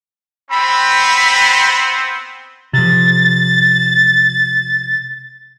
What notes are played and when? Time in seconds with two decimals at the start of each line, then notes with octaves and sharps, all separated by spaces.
0.51 B3 C4 B5
2.73 C3 F3 A6